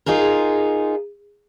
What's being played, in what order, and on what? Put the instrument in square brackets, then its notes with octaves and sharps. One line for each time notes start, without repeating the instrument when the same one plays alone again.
[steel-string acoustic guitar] D#4 F4 G#4 A#4